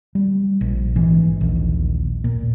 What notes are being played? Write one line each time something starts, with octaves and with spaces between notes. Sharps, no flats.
G3
A#1
G#1 G#2 E3
A#1 D#2
A#2